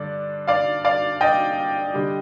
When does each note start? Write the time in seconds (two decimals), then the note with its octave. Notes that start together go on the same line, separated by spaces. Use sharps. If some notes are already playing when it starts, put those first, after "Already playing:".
Already playing: G2 D3 D5
0.48 D5 F5
0.84 D5 F5
1.21 D#5 G5
1.94 D3 G3